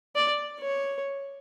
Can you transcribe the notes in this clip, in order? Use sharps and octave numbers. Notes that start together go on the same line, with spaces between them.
D5
C#5